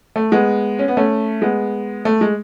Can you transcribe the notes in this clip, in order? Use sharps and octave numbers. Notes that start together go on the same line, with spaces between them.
A3
G#3 B3
C#4
B3
A3 C#4
G#3 B3
A3
G#3